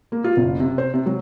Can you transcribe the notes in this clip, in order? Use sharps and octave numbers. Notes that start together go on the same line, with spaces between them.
A#3
F4
F#1
C3
C5
C3
F#3